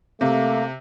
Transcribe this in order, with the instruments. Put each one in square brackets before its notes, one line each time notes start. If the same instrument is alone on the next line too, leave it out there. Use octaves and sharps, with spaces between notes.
[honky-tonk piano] C3 [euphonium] A3 [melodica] A#3